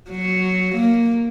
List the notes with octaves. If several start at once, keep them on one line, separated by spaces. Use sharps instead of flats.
F#3
A#3